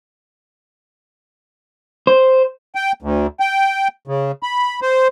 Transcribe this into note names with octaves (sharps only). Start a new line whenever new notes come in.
C5
G5
D2
G5
C#3
B5
C5